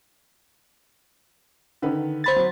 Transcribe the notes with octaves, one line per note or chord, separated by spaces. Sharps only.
D3 D#3 B4
C5 B5 A6
F#3